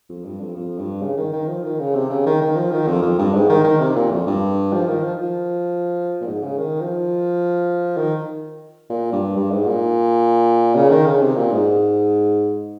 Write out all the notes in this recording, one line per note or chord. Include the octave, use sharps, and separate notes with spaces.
F2
G2
F2
F2
G2
C#3
D#3
D#3
F3
D#3
C#3
C3
C#3
D#3
D#3
F3
D#3
F2
F2
G2
G#2
D#3
D#3
C3
A#2
F2
G2
F3
D#3
F3
F3
A#2
G#2
C#3
D#3
F3
D#3
A#2
G2
G2
G#2
A#2
C#3
D#3
C#3
C3
A#2
G#2